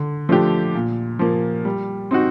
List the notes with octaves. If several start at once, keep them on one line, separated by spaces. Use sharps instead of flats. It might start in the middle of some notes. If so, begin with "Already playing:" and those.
Already playing: D3
F3 A3 D4 G4
A#2
F3 A#3
G3
C4 D#4 F#4